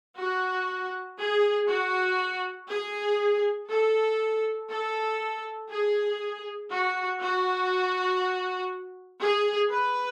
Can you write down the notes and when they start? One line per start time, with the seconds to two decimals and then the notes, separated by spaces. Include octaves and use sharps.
0.18 F#4
1.19 G#4
1.68 F#4
2.69 G#4
3.69 A4
4.70 A4
5.70 G#4
6.69 F#4
7.20 F#4
9.20 G#4
9.70 B4